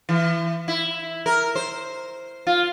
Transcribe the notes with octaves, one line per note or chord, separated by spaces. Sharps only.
E3
E4
A#4
C5
F4